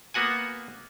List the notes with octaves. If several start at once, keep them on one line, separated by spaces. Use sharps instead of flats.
A#3 B3 F#4 F#5 G#5